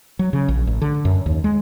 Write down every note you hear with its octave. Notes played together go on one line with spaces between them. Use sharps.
F#3
C#3
A#1
A1
D3
F#2
D#2
G#3